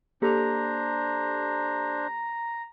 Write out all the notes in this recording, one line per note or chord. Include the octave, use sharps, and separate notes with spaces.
A#3 D4 G4 A4 C5 A#5